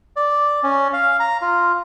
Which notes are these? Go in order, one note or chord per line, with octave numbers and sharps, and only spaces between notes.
D5
C#4
F5
A#5
F4